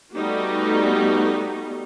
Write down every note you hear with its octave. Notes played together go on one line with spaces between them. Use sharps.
G3 A3 B3 D#4 F#4 G4